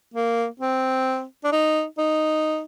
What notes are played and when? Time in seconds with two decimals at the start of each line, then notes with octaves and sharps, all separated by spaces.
0.14 A#3
0.60 C4
1.44 D4
1.52 D#4
1.98 D#4